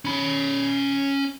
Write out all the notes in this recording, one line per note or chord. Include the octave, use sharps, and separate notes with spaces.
C#4 B5